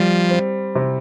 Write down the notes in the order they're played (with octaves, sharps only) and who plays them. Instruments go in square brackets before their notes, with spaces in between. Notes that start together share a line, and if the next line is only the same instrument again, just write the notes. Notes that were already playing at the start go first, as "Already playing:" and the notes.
Already playing: [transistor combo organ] F3 [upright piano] G3
[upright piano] C4
C3